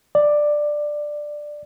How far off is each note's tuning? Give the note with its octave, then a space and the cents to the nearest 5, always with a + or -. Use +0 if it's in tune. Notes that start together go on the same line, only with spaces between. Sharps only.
D5 +10